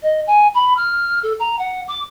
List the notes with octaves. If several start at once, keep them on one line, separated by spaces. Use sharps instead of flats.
D#5
G#5
B5
F6
A4
A#5
F#5
D6